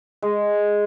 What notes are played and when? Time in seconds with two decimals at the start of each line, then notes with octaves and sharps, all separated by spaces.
0.22 G#3